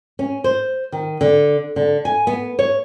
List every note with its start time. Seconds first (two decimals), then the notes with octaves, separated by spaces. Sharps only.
0.19 C#4
0.44 C5
0.92 D#3
1.21 D3
1.76 D3
2.05 G#5
2.27 B3
2.59 C#5